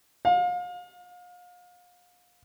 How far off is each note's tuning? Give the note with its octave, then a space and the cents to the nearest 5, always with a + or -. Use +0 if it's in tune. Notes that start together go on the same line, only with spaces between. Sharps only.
F5 +35